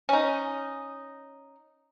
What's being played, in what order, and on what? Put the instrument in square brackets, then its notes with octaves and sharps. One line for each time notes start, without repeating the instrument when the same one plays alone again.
[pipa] C#4 D#4